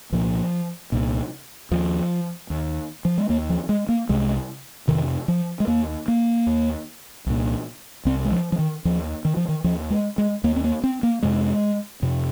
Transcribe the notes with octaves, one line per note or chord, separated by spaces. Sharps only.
C2 A#2 F3
C2 A#2
D#2 F3
D#2
F3
G#3
D#2 A#3
F3
G#3
A#3
C2 C3 G#3
F2 C3 D#3
F3
G#3
D#2 A#3
A#3
D#2
C2 A#2
C2 C3 C4
G#3
F3
F3
D#3
D#2 F3
D#3
F3
D#3
D#2 F3
G#3
G#3
D#2 A#3
C4
A#3
C4
A#3
F2 C3 G#3
F2 C3